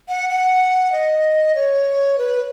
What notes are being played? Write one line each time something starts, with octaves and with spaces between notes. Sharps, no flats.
F#5
F#5
D#5
C#5
B4